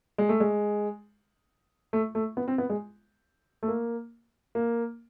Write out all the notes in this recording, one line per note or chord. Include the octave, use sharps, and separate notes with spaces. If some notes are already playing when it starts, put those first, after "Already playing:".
G#3
A3
G#3
A3
A3
B3
C4
B3
G#3
A3
A#3
A#3